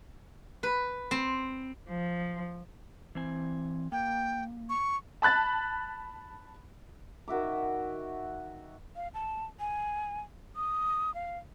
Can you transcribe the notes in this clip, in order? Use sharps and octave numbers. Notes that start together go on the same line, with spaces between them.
B4
C4
F3
E3 C4 G#5
A#3 G5
C#6
A5 B5 F#6 A6
D#3 F#4 E5 D6
F5
A5
G#5
D#6
F5